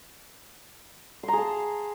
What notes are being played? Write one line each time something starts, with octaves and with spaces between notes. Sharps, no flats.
G#4 A5 A#5 C6